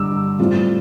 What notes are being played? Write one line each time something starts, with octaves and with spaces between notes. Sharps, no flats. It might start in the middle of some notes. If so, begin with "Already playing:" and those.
Already playing: G2 D3 G3 D6 E6
A2 G3 C4 F4